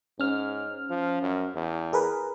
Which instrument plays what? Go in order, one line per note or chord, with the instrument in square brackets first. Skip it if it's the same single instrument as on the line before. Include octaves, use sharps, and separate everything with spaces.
[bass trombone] G#2 [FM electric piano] C#4 F6
[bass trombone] F3
F#2
E2
[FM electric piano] G#4 A#4 B4